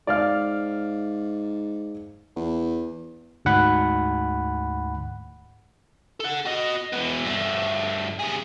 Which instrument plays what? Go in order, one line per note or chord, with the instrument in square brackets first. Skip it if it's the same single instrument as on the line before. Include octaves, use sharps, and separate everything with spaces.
[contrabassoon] G#2 [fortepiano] D5 F5 F6
[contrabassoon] E2
[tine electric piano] D2 G#2 F#5 B5
[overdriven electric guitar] A4 F#5
F#4 D#5
B2 E3
G2 A3
C3 G#4